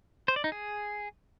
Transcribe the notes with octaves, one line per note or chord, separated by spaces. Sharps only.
C5
D5
D#4
G#4